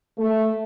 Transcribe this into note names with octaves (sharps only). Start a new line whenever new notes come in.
A3